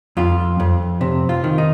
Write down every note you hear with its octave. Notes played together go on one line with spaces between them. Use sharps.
F2 F4
F2
C3
F4
D#3
D#4